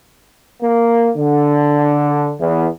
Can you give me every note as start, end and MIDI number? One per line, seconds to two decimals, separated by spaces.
0.62 1.10 58
1.17 2.34 50
2.41 2.66 40